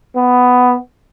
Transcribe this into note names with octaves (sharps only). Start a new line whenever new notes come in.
B3